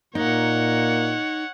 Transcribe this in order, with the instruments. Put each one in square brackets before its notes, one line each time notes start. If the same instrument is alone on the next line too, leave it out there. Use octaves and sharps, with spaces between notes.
[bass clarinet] A#2 [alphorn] A#3 [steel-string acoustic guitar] D#4 [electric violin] C#5 F#5